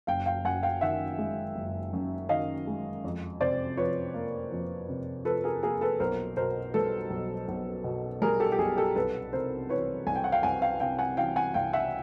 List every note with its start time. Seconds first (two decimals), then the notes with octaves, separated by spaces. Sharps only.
0.07 F#1 F5 G5
0.26 F5 G5
0.44 F#2 F#5 G#5
0.63 F5 G5
0.81 D#3 E5 F#5
1.18 G#3
1.55 F#1
1.93 F#2
2.29 D#3 D#5 F5
2.67 G#3
3.04 F2
3.40 C3 C5 D5
3.77 F3 B4 C#5
4.14 A#3
4.52 F2
4.89 C3
5.25 F3 A4 B4
5.44 G#4 A#4
5.63 A#3 G#4 A#4
5.81 A4 B4
6.00 B1 A#4 C5
6.37 B2 A#4 C5
6.74 G3 A4 B4
7.10 B1
7.48 B1
7.84 B2
8.21 G3 G#4 A#4
8.40 G4 A4
8.52 G4
8.58 B1 G#4
8.77 G4 A4
8.96 C2 A4 B4
9.33 C3 A#4 C5
9.69 E3 B4 C#5
10.06 C2 G#5
10.16 G5
10.24 F#5
10.32 F5 G5
10.43 C2 F#5 G#5
10.62 F5 G5
10.80 C3 F5 G5
10.99 F#5 G#5
11.17 E3 F5 G5
11.36 F#5 G#5
11.54 C2 F5 G5
11.73 E5 F#5